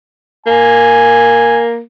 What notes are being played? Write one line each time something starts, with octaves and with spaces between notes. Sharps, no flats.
A#3 G#5